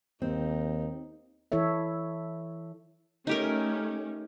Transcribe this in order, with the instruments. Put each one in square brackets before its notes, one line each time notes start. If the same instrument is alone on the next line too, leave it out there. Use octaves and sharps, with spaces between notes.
[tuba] D#2 [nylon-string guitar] C4 [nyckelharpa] D#4
[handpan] E3 E4 A4 C#5 E5
[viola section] A3 C#4 [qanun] D#4 G4 A#4